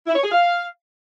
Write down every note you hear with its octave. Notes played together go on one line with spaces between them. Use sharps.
E4
C#5
G#4
F5